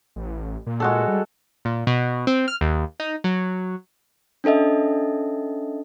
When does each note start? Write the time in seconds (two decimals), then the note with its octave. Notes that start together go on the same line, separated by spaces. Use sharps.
0.16 A1
0.66 A#2
0.80 G#3 F#4 A4
1.08 G3
1.65 A#2
1.87 B2
2.27 C4
2.48 F6
2.61 D#2
3.00 D#4
3.24 F#3
4.44 C#4 D4 A4 D#5 E5